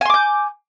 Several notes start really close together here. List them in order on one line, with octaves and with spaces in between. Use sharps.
G#5 C6 D6 G6